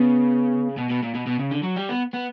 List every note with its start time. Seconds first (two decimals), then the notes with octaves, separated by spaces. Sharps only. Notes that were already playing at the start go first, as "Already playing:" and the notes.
Already playing: C#3 B3
0.77 B2
0.89 B2
1.03 A#2
1.15 B2
1.27 B2
1.39 C#3
1.51 D3
1.63 F#3
1.76 G3
1.89 B3
2.14 B3